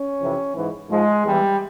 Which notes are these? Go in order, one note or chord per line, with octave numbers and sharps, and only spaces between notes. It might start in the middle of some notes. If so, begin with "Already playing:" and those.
Already playing: C#4
F2 C3 E3
G#2 E3
G#2 F3 G#3
E2 E3 G3